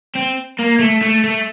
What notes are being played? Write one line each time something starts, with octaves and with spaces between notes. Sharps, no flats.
C4
A#3
A3
A3
A3